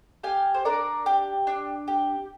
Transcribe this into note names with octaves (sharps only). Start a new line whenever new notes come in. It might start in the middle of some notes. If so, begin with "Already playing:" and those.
G4 F5 G#5
C5
D4 A#4 D5
G4
D4
G4